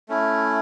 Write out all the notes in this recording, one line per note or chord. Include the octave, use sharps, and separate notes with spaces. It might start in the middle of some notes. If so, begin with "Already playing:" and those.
A3 C#4 E4